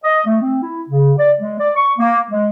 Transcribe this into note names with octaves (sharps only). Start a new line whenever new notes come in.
D#5
A3
C4
E4
C#3
D5
G#3
D5
C#6
A#3
G#3